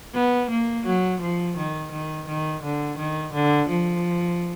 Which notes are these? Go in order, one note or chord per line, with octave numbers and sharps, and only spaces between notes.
B3
A#3
F#3
F3
D#3
D#3
D#3
D3
D#3
D3
F3